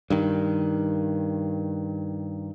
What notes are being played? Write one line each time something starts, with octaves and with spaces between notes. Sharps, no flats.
G2 D#3